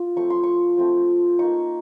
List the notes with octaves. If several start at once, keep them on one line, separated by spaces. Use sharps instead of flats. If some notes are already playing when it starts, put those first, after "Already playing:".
Already playing: F4
F3 A3 C4 C#6
C6
C#6
F3 A3 C4
A#3 D#4 C#6